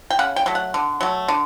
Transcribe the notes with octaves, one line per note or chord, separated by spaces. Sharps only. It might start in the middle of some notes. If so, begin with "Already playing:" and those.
G5
C#3 F#5
G5
F#3 A3
F#5
D3
F#3 A3
D3